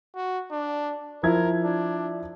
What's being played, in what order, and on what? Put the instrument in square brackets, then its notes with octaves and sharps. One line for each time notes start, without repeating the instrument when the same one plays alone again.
[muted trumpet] F#4
D4
[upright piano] F3 E4 G#6 [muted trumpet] A#4
[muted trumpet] D4